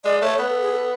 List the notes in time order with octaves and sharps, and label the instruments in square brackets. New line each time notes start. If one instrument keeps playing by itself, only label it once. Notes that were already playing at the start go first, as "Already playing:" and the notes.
[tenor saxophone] G#3 [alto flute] D5
[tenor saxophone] A3 [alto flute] C#5
[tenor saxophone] B3 [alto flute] B4
[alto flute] A4
G#4
A4